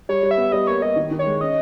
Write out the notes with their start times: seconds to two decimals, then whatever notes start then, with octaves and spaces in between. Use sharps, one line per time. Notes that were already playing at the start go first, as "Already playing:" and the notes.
0.09 G3 C#5
0.23 G3
0.31 E5
0.38 B3
0.52 G3 D#5
0.67 A#3 C#5
0.82 G3 D#5
0.96 D#3
1.11 D#3
1.19 C#5
1.26 G#3
1.41 C#4 D#5